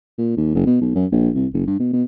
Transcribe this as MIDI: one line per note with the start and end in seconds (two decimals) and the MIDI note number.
0.18 0.32 46
0.37 0.52 39
0.55 0.65 30
0.66 0.77 47
0.81 0.94 35
0.95 1.06 42
1.12 1.29 34
1.34 1.47 36
1.54 1.63 30
1.67 1.76 43
1.80 1.90 47
1.93 2.03 47